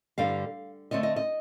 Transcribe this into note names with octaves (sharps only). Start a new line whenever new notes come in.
G2 D3 G3 F5
D3 A3 C4 D#5
D#5
D#5